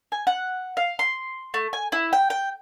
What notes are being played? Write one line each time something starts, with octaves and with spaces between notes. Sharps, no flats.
G#5
F#5
F5
C6
A3
G#5
E4
G5
G5